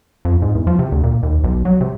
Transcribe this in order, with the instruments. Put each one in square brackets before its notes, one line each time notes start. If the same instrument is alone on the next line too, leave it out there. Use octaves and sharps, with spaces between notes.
[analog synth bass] F2
G#2
E2
F3
C3
D2
A#2
D#2
B1
F#3
C3